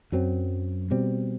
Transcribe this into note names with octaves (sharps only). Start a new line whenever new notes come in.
F#2 F#3 C4
B2 G3 C4